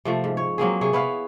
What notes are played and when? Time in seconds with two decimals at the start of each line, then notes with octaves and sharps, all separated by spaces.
0.05 C3 F3 A3
0.24 G#2
0.37 C#5
0.58 F#3 A#3 C4 G#4
0.81 C3 G#4 C#5
0.93 B3 E4 C#5 F5